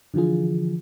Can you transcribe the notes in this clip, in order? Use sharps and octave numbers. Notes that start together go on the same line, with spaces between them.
D3 E3 F3 F4 G#4